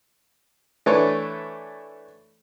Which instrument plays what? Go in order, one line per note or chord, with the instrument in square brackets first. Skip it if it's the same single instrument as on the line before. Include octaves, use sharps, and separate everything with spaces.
[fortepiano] E3 A3 D4 A4 B4 C#5